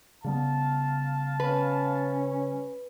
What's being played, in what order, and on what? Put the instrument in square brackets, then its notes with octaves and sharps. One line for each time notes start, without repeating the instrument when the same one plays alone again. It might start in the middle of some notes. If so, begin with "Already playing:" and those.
[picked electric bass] C#3 G3 B3 [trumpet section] F5 A5
[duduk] C#4 [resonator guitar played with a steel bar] B4